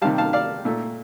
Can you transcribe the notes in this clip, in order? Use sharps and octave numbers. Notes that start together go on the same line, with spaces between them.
C3 D#3 G3 F5 A5
F5 A5
D5 F5
A#2 A3